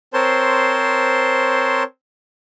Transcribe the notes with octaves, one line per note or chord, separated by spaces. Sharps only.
C4 A#4 C5 C#5 A5 C6